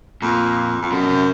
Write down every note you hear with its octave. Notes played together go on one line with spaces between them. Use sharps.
F2 A#2
F2
F#2 B2
C3